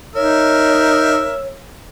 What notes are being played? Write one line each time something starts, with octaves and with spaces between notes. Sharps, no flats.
D#4 A#4 C#5 E5